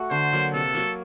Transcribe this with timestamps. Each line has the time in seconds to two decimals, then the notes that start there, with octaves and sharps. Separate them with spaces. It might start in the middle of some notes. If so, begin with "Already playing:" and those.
Already playing: A3 F#4
0.11 D3 C5
0.33 F#3 A#3
0.54 C3 A4
0.75 F#3 A#3